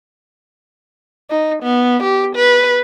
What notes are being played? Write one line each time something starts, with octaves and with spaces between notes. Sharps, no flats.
D#4
B3
G4
B4